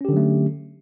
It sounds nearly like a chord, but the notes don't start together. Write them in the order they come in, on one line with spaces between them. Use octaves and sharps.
C#4 G4 D3 F#3 A3